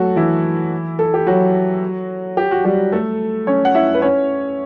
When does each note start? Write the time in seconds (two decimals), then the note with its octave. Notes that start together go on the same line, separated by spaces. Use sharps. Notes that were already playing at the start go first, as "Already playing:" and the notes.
Already playing: F#3 A3 F#4 A4
0.16 E3 E4
0.99 A4
1.14 G4
1.26 F#3 F#4
2.37 G4
2.51 F#4
2.64 G3 G4
2.92 A3 A4
3.47 C#4 C#5
3.65 F#5
3.75 E4 E5
3.94 B4
4.02 C#4 C#5